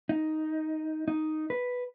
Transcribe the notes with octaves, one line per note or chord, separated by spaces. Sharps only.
D#4
D#4
B4